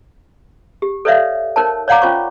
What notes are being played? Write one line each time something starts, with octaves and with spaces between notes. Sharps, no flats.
G4
A4 B4 C#5 D5 E5 F5
D#4 A#4 C5 C#5 A5
C#5 D5 F5 F#5 A#5 D6
C#4 F4 C5 C#5 C#6